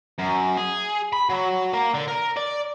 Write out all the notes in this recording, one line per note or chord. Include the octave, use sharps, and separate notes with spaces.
F#2
G#4
B5
F#3
A#3
D3
A#4
D5